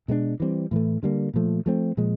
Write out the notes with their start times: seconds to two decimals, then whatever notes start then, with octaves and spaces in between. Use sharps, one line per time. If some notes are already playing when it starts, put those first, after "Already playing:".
0.08 B2 G#3 B3 D4
0.40 E3 G3 C4
0.71 A2 E3 A3
1.03 D3 G3 A#3
1.34 A#2 F3 A3
1.66 F3 A3 C4
1.97 A#2 F3 G#3